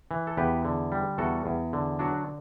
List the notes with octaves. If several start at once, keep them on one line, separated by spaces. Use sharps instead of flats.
E3
A4
E2 G4 B4
D3
G3
E2 F#4 A4
E2
D3
F#3 D4 F#4